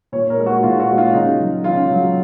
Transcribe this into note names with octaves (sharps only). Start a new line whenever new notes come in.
A#2 C#5
A#4
G#3
F#4
A#2 F4
F#4
G#3
F4
C#3 D#4
F#3
C#3 F4
F#3